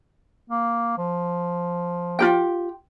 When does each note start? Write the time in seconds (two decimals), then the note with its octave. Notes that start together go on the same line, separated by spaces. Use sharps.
0.50 A#3
0.97 F3
2.19 F4 G4 G5